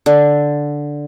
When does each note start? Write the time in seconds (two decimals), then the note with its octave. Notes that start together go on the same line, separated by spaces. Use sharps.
0.06 D3